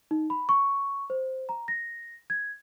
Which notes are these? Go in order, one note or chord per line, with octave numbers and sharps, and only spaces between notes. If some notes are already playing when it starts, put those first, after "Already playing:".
D#4
B5
C#6
C5
A#5
A#6
G#6